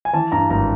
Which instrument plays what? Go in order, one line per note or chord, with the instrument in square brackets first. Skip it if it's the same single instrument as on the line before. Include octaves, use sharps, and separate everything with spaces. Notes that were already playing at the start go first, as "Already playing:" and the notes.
[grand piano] G#5
E3 A5
G2 A#5
G#1 A#5